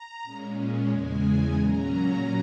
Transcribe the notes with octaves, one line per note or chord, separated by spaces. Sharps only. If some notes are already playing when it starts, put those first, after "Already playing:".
Already playing: A#5
A#2 G#3 C#4
E2 C#3 G#3 G#5
A#2 F#3 C#4 A#5